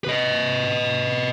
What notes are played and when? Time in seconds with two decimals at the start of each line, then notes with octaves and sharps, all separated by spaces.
0.05 B4 D#5